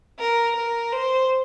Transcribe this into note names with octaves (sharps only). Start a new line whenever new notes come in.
A#4
A#4
C5